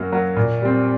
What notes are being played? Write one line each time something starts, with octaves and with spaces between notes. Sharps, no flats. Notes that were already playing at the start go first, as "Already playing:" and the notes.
Already playing: F#2 F#3 A#3
F#3 A#3
A#2
G3 C4